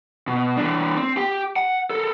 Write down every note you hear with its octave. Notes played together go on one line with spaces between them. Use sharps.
B2
E3 D4
C4
G4 G5
F#5
A4 A#4